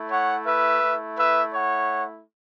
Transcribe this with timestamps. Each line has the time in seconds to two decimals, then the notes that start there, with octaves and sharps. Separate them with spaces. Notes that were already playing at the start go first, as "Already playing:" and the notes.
Already playing: A3 E4
0.10 C#5 F#5
0.47 B4 E5
0.83 A3 E4
1.18 B4 E5
1.54 C#5 F#5